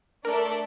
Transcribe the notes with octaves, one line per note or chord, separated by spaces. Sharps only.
A3 D4 A4 A#4 D5